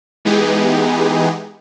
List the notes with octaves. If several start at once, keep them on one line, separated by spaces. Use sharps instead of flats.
E3 G#3 B3 D#4 G4 G#4